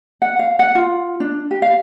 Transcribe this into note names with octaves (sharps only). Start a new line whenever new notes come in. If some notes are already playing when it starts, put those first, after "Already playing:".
F#5
F5
F#5
F4
D4
G4
F5